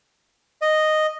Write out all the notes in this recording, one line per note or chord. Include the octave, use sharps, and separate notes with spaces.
D#5